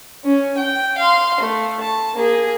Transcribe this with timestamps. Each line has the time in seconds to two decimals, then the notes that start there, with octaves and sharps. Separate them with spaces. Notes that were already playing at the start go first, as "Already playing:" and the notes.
0.25 C#4
0.57 G5
0.98 F5 C6
1.40 A3
1.81 A5
2.14 A#3 G#4